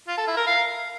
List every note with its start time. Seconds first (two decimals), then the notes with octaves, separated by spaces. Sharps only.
0.08 F4
0.18 A4
0.27 E4
0.37 A#4
0.47 F5